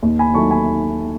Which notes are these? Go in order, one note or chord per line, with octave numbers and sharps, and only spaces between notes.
D#2
G#5 B5
D#3 F#3 A3 A5 C#6
G#5 B5